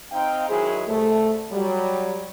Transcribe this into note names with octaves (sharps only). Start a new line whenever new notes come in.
C4 D#4 F5 G5
D#3 F#3 G#3 E4 G#4
C2 A3
F#3 G3